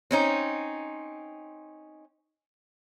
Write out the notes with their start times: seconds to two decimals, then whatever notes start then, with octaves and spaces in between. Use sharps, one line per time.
0.11 C4 C#4 D#4